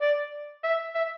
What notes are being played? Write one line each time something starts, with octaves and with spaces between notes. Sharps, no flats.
D5
E5
E5